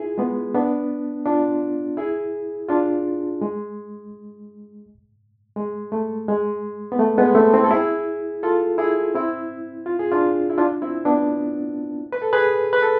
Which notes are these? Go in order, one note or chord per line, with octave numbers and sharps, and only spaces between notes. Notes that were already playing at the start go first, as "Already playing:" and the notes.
Already playing: E4 F4 G#4
G#3 B3
B3 D4
D4 F4
E4 G#4
D4 F4
G#3
G#3
A3
G#3
B3
A3
G#3 B3
A3 C4
C4 E4
A4
E4 G#4
F4 A4
E4 G#4
C4 E4
F4
G#4
D4 F4
E4
D4 F4
C4 E4
B3 D4
B4
A4
G#4 B4
B4
A4